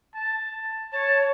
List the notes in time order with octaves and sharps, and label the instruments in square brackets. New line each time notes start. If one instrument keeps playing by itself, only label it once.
[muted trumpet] A5
[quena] C#5 [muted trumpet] A5